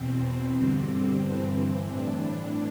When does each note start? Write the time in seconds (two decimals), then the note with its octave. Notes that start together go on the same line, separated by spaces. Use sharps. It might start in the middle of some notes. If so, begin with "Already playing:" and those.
Already playing: E2 B2 C4
0.57 G2 D3
1.23 G2 E3 C4
1.90 A2 E3 D4